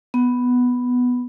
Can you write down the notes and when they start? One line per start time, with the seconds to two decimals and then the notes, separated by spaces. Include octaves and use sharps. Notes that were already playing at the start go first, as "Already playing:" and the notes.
0.14 B3